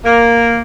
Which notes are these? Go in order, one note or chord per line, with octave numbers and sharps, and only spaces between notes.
A#3